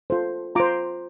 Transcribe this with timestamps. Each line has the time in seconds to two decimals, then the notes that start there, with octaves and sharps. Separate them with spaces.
0.10 F4 A4 C5
0.55 F4 A#5 D6
0.60 C5